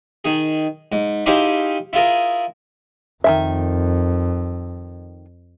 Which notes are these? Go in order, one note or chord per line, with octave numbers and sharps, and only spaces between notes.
D#3 G#4
G#2
D#4 E4 G4 G#4 C5 F5
E4 F4 G#4 A#4
F2 D#3 E3 E5